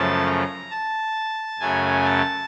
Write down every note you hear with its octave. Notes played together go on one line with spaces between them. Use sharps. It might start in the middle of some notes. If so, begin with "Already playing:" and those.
Already playing: F#2 C#3 F3 A3 A5
A#5
A5
F#2 C#3 F#3 A3 G#5
A5